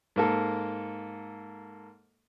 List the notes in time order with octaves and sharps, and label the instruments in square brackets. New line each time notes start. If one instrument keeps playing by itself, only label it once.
[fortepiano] G#2 A#3 A4